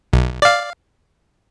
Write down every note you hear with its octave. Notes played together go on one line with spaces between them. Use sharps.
B1
D5 F5